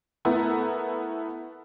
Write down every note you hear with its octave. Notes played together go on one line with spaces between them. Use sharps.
A3 B3 E4 A4 A#4